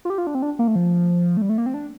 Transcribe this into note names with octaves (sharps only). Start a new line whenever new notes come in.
F4
G4
F4
D4
C4
D4
A#3
A3
F3
A3
G3
A3
A#3
C4
D4